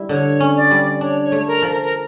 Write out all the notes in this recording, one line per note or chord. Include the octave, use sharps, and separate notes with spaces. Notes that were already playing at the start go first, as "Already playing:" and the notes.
Already playing: G3 E4
D3 C#5
C#4
D5
G3
D4 C#5
C#5
A3
A#4
F3
A#4
A#4